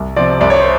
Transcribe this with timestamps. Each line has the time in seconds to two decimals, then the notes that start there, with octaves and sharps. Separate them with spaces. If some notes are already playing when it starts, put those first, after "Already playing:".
Already playing: C2
0.16 C3 F3 D5
0.41 C2 D5
0.50 C#5
0.60 C5